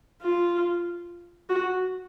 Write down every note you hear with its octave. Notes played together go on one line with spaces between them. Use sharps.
F4
F#4